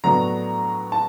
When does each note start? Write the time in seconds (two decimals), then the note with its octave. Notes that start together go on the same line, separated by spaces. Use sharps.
0.04 A2 F#3 B3 D4 A#5
0.92 A5